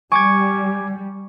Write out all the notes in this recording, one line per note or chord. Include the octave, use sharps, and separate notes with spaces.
G3 G#5 C#6 D6 G#6 D7